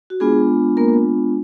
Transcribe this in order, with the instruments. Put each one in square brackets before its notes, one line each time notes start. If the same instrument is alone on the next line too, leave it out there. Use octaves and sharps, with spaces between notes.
[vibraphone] F#4
G#3 B3 D4 F4 G#4
A#3 A#4